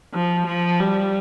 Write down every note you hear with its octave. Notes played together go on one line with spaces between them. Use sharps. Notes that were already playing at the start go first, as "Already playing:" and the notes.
F3
F3
G3